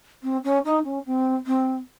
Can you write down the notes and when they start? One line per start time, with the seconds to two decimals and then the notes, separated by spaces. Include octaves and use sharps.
0.22 C4
0.44 C#4
0.64 D#4
0.84 C#4
1.05 C4
1.46 C4